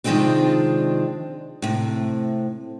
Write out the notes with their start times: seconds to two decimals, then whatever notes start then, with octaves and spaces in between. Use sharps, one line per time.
0.04 C3 D#3 F3 G#3 C4 D4
1.62 A2 C3